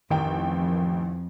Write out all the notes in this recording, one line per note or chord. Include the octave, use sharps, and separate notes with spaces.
A1 F2 D#3 G5